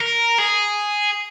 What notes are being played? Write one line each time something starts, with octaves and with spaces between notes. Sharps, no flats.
A#4
G#4